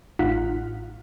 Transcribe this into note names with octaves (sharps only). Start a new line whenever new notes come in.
A1 D#4 F4 F#5 F6 B6